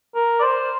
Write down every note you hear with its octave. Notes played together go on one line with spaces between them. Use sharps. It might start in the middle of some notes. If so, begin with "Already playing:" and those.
A#4
D5
C5